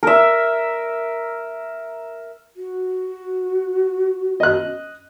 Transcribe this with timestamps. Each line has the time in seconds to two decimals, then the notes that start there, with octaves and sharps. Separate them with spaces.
0.03 A#4 E5
2.56 F#4
4.40 D#5 F#6